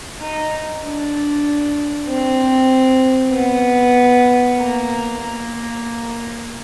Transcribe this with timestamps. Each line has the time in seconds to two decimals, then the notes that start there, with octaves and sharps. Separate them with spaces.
0.21 D#4
0.83 D4
2.07 C4
3.31 B3
4.56 A#3
5.19 A#3